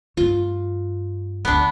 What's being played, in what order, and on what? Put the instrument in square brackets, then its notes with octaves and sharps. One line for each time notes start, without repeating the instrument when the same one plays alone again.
[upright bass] G2 A3 [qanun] F4
[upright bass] D2 D3 [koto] B3 D4